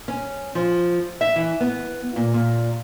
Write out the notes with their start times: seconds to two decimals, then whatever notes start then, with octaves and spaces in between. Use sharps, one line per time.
0.08 C#4
0.55 F3
1.21 E5
1.36 E3
1.60 B3
2.16 A#2
2.34 A#2